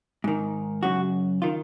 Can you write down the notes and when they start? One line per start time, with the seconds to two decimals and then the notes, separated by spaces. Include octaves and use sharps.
0.24 G#2 D#3
0.83 F#2 C#3 F#4
1.42 D#3 F4